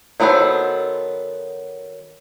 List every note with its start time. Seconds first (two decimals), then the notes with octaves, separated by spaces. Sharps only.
0.20 D#3 F#3 B3 A4 C5